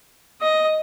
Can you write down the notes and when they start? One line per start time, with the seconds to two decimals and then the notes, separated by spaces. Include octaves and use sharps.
0.42 D#5